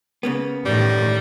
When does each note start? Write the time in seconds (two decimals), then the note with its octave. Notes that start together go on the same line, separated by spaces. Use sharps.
0.23 C#3 A#3 B3
0.66 A2 D#3 G3